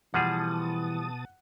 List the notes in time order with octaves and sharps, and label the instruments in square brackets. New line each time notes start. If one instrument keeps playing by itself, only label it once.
[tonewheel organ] B2 A5 D#6 [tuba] E3 [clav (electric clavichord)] F3 G3 G#4 [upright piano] F#5